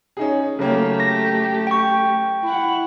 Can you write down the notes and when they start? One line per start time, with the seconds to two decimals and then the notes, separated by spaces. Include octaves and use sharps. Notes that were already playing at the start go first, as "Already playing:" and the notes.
0.17 C#4 D#4 G#4
0.59 C#3 F#3 A3 A#3 G4
1.00 A#6
1.67 G5 C#6
2.44 E4 F#5